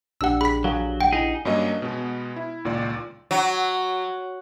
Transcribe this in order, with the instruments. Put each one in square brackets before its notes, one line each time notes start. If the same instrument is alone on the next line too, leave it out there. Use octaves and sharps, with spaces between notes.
[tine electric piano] A#1 D4 G4 [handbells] F#5 E6
[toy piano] G#4 [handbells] B5 B6
[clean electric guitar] F#3 [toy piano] A4 F5 G#5
[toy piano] F#5 [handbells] G5
[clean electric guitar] D#4 G#4 [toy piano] E4
[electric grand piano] G2 F#3 A#3 C#4 D4 D#5
B2 G#3 B3
E4
C#2 A#2 D#3 D5
[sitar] F#3